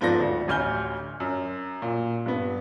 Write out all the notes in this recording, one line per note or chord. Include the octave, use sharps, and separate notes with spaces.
G#2 F3 B3 A4 D5 A#6
D2
A1 D2 G#5 F6 G6 G7
F#2
A#2
G2 B3